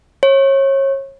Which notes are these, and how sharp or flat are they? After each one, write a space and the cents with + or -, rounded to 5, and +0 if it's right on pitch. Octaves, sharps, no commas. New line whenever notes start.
C#5 -30